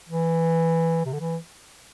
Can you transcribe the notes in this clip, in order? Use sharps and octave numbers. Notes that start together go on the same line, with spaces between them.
E3
C3
D3
E3